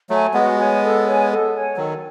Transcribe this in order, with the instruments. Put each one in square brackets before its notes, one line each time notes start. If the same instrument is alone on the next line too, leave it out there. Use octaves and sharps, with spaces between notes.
[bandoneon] F#3 A3 [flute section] C#5 G#5
[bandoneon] G#3 B3 [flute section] F#4
[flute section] C#5 G#5
A4
C#5 G#5
A4
C#5 G#5
[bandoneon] D#3 F#3 [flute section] A4